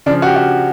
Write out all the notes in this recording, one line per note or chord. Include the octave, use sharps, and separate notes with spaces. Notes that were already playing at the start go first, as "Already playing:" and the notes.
C#3 F3 D4
F#4
G4
F#4